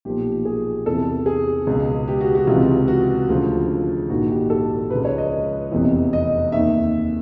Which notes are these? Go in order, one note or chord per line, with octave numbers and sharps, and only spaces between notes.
B1 A#2 F3 G4
G#4
E2 C3 E3 A4
G#4
C#2 B2
G4
F#4
F#4
C#2 C3 E3 F4
F#4
D2 C#3 F3 F4
A#1 G#2 D#3 F#4
G4
A4
C#2 C#3 F3 B4
C#5
D#5
F1 E2 C3 E3
D#5
D#2 D#3 E5